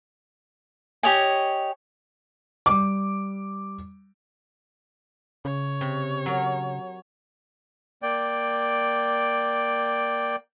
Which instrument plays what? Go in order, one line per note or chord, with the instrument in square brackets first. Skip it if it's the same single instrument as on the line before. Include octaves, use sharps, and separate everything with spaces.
[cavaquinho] G4 C#5 D#5 G#5
[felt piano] G3 D6
[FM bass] C#3 [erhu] C#5
[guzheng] C3
F#3 A#4
[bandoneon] A#3 D5 G5